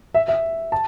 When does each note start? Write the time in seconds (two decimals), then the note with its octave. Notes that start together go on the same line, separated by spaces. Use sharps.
0.14 E5
0.28 E5
0.72 A5